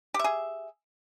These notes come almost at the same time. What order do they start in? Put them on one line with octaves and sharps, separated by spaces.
G4 E5 G#4